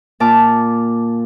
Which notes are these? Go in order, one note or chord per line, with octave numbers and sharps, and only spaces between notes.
A#2 A5 D6 F6